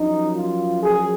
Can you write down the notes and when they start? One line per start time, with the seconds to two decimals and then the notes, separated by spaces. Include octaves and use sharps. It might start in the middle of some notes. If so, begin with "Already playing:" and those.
Already playing: F#2 F3 D#4
0.35 F4
0.80 G#4